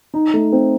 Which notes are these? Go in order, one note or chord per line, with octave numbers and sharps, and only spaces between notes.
D#4
A3
C4